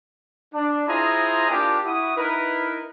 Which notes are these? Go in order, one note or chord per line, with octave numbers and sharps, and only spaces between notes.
D4
E4 F4 G#4 C5 D#5 A#5
A#3 D4 F4 G4
E4 F#4 D#6
D#4 E4 A#4 B4